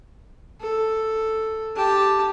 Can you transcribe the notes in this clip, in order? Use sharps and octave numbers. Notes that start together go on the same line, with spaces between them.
A4
G4 A5